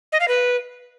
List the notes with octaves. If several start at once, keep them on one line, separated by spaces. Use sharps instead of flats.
D#5
F5
B4